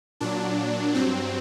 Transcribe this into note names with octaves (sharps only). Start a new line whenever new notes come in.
A#2 F#3 D4
G2 F#3 C4